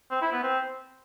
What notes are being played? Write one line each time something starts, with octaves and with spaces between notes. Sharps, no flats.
C4
E4
B3
C4